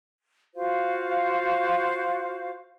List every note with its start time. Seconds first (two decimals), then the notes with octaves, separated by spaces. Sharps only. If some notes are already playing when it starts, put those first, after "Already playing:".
0.55 F4 F#4 C5 F5